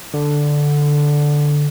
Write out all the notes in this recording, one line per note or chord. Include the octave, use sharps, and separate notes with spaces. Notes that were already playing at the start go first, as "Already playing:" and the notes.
D3